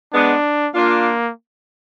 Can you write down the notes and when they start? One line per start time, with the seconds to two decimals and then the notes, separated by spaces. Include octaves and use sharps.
0.13 G#3 B3 D4
0.75 A#3 D4 F4